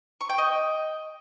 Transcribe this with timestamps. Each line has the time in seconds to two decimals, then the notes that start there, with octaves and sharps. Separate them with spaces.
0.21 C#6
0.29 G5
0.38 D#5